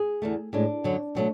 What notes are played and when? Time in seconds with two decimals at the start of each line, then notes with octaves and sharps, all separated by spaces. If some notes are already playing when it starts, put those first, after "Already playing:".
Already playing: G#4
0.22 E2 D3 A3
0.53 A2 G#3 D4
0.84 F#2 D3 F#3
1.15 B2 F#3 A3